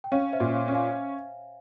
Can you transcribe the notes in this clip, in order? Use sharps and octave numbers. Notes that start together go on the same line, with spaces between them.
G5
C#4 C#5 F5
C5 E5
A#2
C#5 F5
C#4
F5 G#5